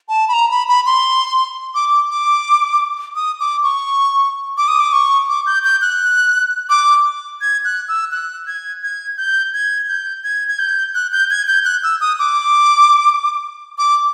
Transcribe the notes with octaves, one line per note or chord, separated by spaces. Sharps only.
A5
B5
A#5
B5
B5
C6
D6
D6
D#6
D6
C#6
D6
D#6
D6
C#6
D6
G6
G6
F#6
D6
G#6
F#6
E6
F#6
G#6
G#6
G6
G#6
G6
G#6
G#6
G6
F#6
G6
G#6
G6
F#6
E6
D#6
D6
D6